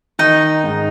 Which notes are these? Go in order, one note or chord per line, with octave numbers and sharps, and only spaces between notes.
D#3 D#4
G#2